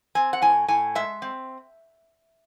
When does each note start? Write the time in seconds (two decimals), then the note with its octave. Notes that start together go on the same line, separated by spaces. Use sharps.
0.15 C4 G#5
0.33 F#5
0.42 A2 G#5
0.68 A2 G#5
0.95 G#3 E5
1.22 C4